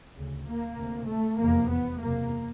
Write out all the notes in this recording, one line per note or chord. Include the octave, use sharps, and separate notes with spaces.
D2 C#3
A#3
D2 C3
A3
F1 E2 C3 A#3
B3
F#1 E2 C3 A#3